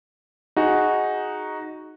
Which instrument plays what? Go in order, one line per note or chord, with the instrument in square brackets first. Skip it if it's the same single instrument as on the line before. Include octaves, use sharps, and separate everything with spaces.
[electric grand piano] D#4 F#4 G#4